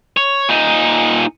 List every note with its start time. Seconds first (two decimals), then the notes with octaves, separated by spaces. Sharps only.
0.17 C#5
0.49 A#2 D#4